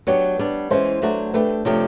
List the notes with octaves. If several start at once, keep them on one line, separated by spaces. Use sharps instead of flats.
F#3 B3 D4 G4 C#5
G3 B3 D4
E3 G#3 C#4 C5
F#3 A3 D4 F#4
A3 D4 G4 B4
C3 F3 A3 D4 G4 C#5